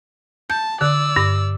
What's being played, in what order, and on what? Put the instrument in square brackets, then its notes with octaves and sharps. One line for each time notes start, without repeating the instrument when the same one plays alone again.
[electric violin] A5 [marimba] G6
[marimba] D3 [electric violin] D5 E6
[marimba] G2